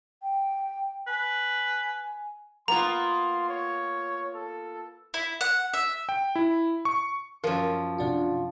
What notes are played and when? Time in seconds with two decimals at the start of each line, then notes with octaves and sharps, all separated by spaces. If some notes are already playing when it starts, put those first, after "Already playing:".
0.23 G5
1.07 B4 G#5
2.68 A#3 B3 F4 A#5 C6
3.49 C#5
4.35 A4
5.14 E4
5.41 F#5
5.73 E5
6.09 G5
6.36 E4
6.85 C#6
7.44 F#2 F3 A#4
7.98 C3 D4 F4 F#4